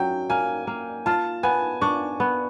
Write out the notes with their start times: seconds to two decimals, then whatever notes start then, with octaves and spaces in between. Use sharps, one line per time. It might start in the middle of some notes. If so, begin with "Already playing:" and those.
Already playing: F#3 C#4 G5
0.30 A#3 G#5
0.67 A#3
1.06 F4 A5
1.43 B3 G#5
1.81 D4 C#6
2.20 B3